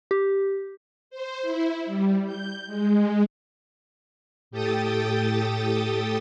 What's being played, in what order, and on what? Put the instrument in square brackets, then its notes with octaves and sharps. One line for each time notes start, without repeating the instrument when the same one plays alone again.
[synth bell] G4
[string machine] C5
E4
G3
G6
G#3
A2 G4 A4 G5 D#6 A6